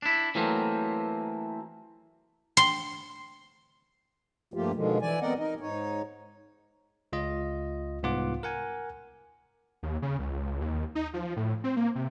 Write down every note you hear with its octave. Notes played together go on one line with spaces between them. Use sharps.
D4 E4
E3 F#3 A3 A#3 C4
C6
G2 F3 A3 A#3 F4 G4
B2 D3 D#3 F3 G#3
E3 D5 G#5
B3 C4 A#4 D5 D#5 F#5
D#4 A#4 D#5
G#2 D#4 C#5
C#2 F4 D#5
C2 G#2 B3 F4 F#5 D6
A#4 F#5 G#5
D#2
C#3
C#2
D#2
D#4
F3
A2
C4
A#3
C3